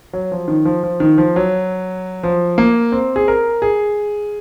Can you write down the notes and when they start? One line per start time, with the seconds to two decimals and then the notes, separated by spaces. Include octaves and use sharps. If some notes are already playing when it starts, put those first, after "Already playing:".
0.13 F#3
0.32 F3
0.48 D#3
0.65 F3
0.83 F3
1.00 D#3
1.18 F3
1.36 F#3
2.23 F3
2.58 A#3
2.92 C4
3.16 G#4
3.28 A#4
3.62 G#4